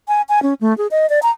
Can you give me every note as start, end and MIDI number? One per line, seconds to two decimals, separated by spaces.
0.08 0.22 80
0.29 0.42 80
0.42 0.54 61
0.61 0.76 57
0.78 0.87 68
0.91 1.09 75
1.09 1.20 74
1.23 1.31 82